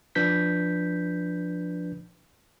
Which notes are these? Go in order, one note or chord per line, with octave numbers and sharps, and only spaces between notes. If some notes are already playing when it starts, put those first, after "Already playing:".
F3 D4 B4 G6 B6